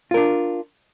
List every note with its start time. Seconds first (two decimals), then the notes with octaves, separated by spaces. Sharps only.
0.11 F4
0.14 A#4
0.17 D4